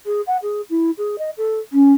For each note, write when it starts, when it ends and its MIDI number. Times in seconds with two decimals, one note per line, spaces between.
0.06 0.21 68
0.27 0.37 78
0.42 0.61 68
0.70 0.91 64
0.98 1.16 68
1.18 1.30 75
1.37 1.59 69
1.72 1.93 61